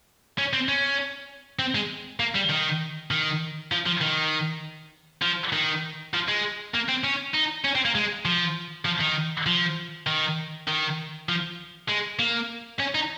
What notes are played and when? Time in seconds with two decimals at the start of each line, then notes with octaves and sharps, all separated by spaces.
0.38 C#4
0.53 C4
0.69 C#4
1.59 C4
1.75 G#3
2.20 A#3
2.35 G3
2.50 D#3
3.11 D#3
3.72 F3
3.86 F3
4.01 D#3
5.22 F3
5.53 D#3
6.14 F3
6.28 G#3
6.74 A#3
6.89 C4
7.04 C#4
7.34 D#4
7.65 C#4
7.75 C4
7.85 A#3
7.95 G#3
8.25 F3
8.85 F3
9.01 D#3
9.46 F3
10.07 D#3
10.67 D#3
11.29 F3
11.88 G#3
12.19 A#3
12.79 C#4
12.95 D#4